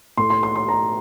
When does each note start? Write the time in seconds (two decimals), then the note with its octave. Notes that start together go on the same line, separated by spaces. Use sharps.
0.17 A2 A3 C6
0.30 C6
0.43 C6
0.55 C6
0.69 A#5